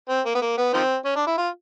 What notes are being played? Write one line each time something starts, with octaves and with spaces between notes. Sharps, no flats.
C4
A#3
B3
A#3
B3
D#3 F3 C4
C#4
D4
E4
F4